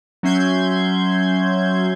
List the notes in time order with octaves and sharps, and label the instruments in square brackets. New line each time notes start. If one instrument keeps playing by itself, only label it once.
[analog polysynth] F#3 C#4 E5 C6 G6 G#6